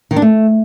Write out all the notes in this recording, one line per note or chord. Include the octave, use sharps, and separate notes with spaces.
D#3
D4
A3